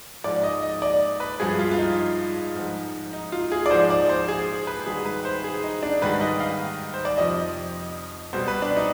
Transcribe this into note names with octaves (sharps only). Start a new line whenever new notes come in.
G#2 F3 D5
D#5
D#5
D5
B4
G2 F3 G#4
F4
F4
D#4
G#2 F3
D#4
F4
G#4
D5
G#2 F3 C5
D5
C5
G#4
B4
G#2 D#3 G3 G#4
B4
C5
G#4
D#4
D4
G#2 D#3 G3 B4
D#5
F5
C5
D5
F2 C3 F3 D#5
B2 G3 C5
B4
D4
D#4